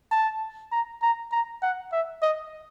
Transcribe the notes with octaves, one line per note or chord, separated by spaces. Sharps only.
A5
A#5
A#5
A#5
F#5
E5
D#5